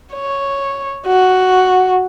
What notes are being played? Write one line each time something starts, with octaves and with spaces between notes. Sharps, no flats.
C#5
F#4